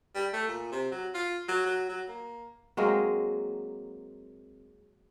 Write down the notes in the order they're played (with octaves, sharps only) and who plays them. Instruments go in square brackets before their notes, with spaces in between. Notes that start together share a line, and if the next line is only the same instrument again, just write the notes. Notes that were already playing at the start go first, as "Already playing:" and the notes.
[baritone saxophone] G3
A3
A#2
C3
F#3
F4
F#3
F#3
F#3
A#3
[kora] F#3 G#3 A#3 C4